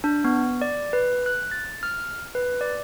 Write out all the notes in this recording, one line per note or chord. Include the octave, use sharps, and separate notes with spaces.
D4
B3
D5
B4
F#6
A6
F6
B4
D5